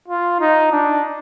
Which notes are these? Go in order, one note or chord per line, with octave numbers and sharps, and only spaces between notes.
F4
D#4
D4